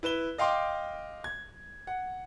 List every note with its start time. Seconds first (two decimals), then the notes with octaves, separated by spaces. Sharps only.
0.03 E4 B4 E7 G7
0.38 D#5 F5 G5 C6 D6
1.24 G#6
1.87 F#5